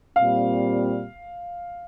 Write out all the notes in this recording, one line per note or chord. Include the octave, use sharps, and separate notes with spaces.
A#2 G3 C4 F5